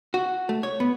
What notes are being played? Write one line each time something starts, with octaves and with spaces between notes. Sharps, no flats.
F#4
A3
C#5
B3